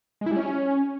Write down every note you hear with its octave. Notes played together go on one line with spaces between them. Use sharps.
G#3
E4
G3
C#4